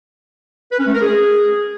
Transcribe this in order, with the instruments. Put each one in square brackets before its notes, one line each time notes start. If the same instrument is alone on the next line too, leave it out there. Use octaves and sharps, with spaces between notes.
[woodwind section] B4
C#4
A3
A#4
G#4